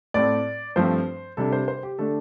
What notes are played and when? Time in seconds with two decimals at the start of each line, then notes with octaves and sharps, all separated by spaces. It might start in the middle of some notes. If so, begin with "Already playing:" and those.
0.14 A2 A3 C4 D5
0.76 G2 F3 A3 C4 C5
1.37 C3 G3 D4 A4
1.53 C5
1.68 C5
1.83 G4
1.99 D3 A3 D4 A4